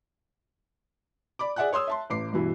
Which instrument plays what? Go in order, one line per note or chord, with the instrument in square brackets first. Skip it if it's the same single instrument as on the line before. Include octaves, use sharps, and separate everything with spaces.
[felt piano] D5 B5 D6
G#4 D5 E5 F#5 G#5 F#6
G#4 C#5 C6 D#6 E6
E5 A5 C6
A1 D6 C7
G2 B2 E3 E4